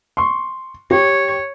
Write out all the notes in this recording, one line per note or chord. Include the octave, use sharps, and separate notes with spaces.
C6 C#6
G4 C#5